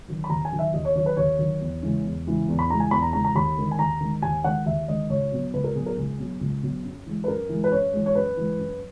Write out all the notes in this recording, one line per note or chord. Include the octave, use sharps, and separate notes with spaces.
D#3 F#3
B5
D#2 A#5
G#5
D#3 F#3
E5
D#2 D#5
C#5
D#3 F#3 C#5
B4
D#2 C#5
D#3 F#3
E2
C#3 E3 G#3
E2
C#3 E3 G#3
E2
B5
C#3 E3 G#3 A#5
G#5
E2 B5
A#5
C#3 E3 G#3 A#5
A#5
D#2 B5
D#3 G#3
G#5
D#2 A#5
D#3 G#3
D#2 G#5
D#3 G#3 F#5
D#2 E5
D#3 G#3 D#5
C#2 C#5
B2 F#3
C#2 B4
A#4
B2 F#3 G#4
A#4
C#2 G#4
B2 F#3
C#2
B2 F#3
F#2
E3 G#3
B4
F#2 A#4
E3 G#3
B4
F#2 C#5
E3 G#3
C#5
F#2 B4
E3 G#3
F#2